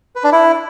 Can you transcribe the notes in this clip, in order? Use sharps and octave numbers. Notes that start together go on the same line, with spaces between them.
B4
D4
E4